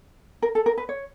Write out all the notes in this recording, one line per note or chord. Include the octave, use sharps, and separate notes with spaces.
A#4
A4
A#4
B4
C#5